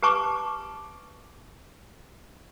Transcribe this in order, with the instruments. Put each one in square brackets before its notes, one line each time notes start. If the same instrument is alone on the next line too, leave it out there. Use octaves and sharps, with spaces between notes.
[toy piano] G4 B4 A5 C#6 D6